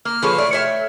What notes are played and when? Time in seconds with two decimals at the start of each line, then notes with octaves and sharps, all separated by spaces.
0.05 A#3 F6
0.22 F3 G#4 A4 B4 C#5
0.38 E3 A3 C#5 D5
0.53 C#5 E5 G5